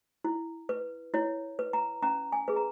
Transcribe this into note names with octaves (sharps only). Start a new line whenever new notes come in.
E4
B4
E4 C#5
B4
A#5
C#4 A#5
G#5
G#4 B4
A#5